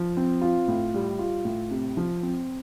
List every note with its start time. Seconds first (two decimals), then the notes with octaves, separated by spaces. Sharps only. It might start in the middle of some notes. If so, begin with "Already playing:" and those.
Already playing: F3
0.17 C4
0.41 F4
0.68 A2
0.94 G3
1.19 F4
1.45 A2
1.71 C3
1.97 F3
2.23 C4